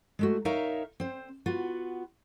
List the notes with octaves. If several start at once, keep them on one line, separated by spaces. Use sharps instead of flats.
G#3 A3 F#4
D#4 A#4 C#5 E5 F5
C4 C5
B3 F4 F#4